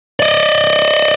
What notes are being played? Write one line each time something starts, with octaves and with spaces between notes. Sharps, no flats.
D5 D#5